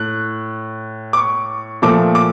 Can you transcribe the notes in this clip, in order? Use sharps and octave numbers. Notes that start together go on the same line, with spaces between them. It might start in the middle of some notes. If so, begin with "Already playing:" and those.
Already playing: A2 F#6
D6
C#6
A#2 F3 A3 D6
D6